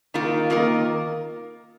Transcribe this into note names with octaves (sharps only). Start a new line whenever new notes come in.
D#3 A#3 F4 A#4
D#3 A#3 F4 A#4